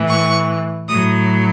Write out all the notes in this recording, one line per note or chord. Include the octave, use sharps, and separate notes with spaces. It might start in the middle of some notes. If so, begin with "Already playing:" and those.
Already playing: A2 E3
C#6
A2 F#3 D#6